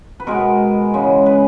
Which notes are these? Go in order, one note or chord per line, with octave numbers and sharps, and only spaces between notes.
B4
B2 G#3 B3 A#4
C#3 E3 G#3
B4